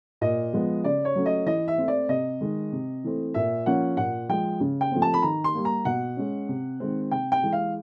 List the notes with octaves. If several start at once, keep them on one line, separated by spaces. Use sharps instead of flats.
A#2 D#5
F3 G#3 B3
C#3 D5
C#5
F#3 A3 C#4
D#5
E3 D#5
E5
A3 C4
D5
C3 D#5
D#3 G#3
C3
E3 A3 C4
A#2 E5
F3 A#3 C#4 F#5
A#2 F#5
F3 G#3 G5
C#3
G5
F3 A3 C4
A5
B5
D#3 A#5
C6
G3 A#3
A#5
B2 F#5
G#3 C#4
C3
D#3 G#3 C4
C3 G5
G5
E3 G#3
F5